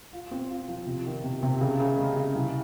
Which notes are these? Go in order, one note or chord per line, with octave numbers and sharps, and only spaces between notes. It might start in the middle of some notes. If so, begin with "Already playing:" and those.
F4
C4
F4
F3
C3
D#3
C3
C3
C#3
C#3
G#3
C#3
C2